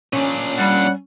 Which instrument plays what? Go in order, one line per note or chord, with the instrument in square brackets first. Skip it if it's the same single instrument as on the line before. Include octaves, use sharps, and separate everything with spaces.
[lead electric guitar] A#2 D4 [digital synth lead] C#4
[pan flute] G3 [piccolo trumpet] F#5